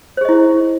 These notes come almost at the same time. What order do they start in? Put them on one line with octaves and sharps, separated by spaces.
C5 G#4 D#5 E4